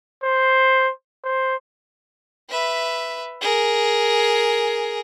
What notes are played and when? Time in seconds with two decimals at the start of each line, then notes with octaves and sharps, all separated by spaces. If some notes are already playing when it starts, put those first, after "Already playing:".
0.24 C5
1.24 C5
2.50 B4 E5
3.41 G#4 A#4